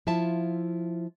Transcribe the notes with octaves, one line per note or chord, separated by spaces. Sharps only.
F3 E4 F4 E5 A5